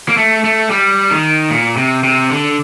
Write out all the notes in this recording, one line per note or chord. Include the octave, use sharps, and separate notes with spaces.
A#3
A3
A3
G3
D#3
A#2
C3
C3
D3